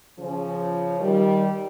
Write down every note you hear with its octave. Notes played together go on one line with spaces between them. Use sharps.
C#3 F3
D#3 G3